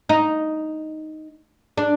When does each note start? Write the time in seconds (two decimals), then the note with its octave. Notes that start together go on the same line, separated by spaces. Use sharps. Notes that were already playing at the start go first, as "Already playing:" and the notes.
0.09 D#4
1.78 D4